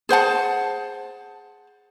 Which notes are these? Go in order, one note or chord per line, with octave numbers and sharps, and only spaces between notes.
G#4 C5 F#5 A5